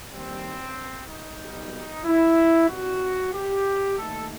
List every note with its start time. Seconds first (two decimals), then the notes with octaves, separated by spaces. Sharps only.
0.12 D#2 D#3 G3 C4
1.08 D#4
1.40 B1 B2 G3
2.05 E4
2.69 C2 C3 E3 G3 F#4
3.33 G4
3.97 D#2 D#3 A3 A4